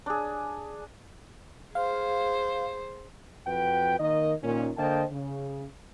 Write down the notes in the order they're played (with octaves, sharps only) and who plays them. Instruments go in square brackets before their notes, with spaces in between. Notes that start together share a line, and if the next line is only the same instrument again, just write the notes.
[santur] D4 G#4
[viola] G#4 C5 [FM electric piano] F5
[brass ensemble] F2 F#4 B4 G5
D#3 A#3 A#4 D#5
A#2 D#3 C#4
D3 A#3 C5 D#5 G5 A5
C#3